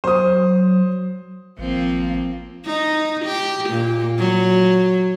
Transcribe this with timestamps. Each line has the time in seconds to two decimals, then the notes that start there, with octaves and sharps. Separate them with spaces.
0.04 F#3 C5 D#6
1.59 G#1 F3 A#3 C4
2.65 D#4
3.25 G4
3.70 A#2
4.18 F#3